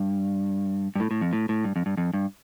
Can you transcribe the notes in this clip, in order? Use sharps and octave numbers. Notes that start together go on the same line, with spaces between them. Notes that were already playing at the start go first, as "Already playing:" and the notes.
Already playing: G2
G2
A2
A2
F2
A2
A2
G2
F2
G2
F2
G2